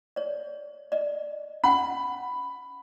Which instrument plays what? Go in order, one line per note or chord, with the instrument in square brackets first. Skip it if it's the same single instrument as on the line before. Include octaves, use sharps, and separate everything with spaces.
[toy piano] C#5 D5
D5 D#5
[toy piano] C#4 F#5 G5 [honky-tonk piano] B5